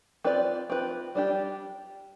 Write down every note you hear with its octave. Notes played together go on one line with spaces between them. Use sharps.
C4 F4 B4 D5
C4 F4 B4
G3 D4 G4